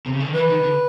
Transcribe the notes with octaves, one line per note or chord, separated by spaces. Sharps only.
C3
C#3
D3
D#3
E3 B4
D#3
D3